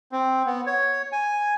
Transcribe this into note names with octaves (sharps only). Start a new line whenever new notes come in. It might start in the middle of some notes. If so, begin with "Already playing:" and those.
C4
B3
C#5
G#5